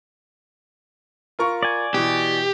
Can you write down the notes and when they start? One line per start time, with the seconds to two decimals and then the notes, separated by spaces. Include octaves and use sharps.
1.39 F4 A#4 C#6
1.63 D5 G#5
1.94 B2 E3 G4